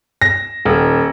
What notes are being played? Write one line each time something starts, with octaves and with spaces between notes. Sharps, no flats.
A#6
D#1